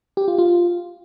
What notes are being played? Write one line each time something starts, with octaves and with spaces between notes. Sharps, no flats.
G4
F4
F4